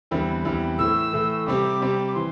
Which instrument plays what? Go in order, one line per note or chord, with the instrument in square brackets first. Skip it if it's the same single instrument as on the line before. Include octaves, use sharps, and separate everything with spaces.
[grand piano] E2 D3 G3 C4 E4
E2 D3 G3 C4 E4
[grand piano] A2 E3 A3 [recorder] E6
[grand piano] A2 E3 A3
[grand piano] C3 G3 C4 G4 [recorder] D6
[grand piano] C3 G3 C4 G4
[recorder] D6
[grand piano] E3 [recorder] C6